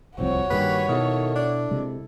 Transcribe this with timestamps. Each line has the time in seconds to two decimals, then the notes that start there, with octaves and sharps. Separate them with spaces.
0.18 D1 C2 F3 C4 F#4 C#5
0.50 G2 D#3 G3 A#3 G4 B4
0.89 B2 D#3 E4 A4
1.36 D4
1.71 C3 G#3